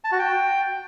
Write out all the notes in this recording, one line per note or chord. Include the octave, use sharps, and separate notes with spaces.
A5
F#4
G5